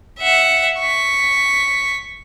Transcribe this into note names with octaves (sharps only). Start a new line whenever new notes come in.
E5 F#5
C#6 B6